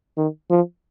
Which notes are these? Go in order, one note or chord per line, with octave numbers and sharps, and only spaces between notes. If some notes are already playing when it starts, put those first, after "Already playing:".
D#3
F3